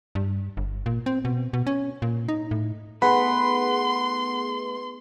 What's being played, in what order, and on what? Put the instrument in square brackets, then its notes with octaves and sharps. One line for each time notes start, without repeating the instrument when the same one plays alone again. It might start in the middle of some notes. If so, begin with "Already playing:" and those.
[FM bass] G2
G1
A#2
C4
B2
B2
C#4
A#2
D#4
A2
[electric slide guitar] A3 B3 D#4 [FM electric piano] G#4 B4 [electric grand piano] F#5 B5 [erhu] C6